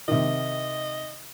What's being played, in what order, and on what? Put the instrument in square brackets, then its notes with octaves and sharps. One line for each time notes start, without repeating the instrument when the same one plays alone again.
[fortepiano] C3 D#3 [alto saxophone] D#5